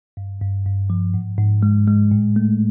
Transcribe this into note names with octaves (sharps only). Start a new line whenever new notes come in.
G2
G2
G2
F3
G#2
G#2
G#3
G#3
A2
A3